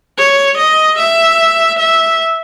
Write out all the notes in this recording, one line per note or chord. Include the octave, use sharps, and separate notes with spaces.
C#5
D#5
E5
E5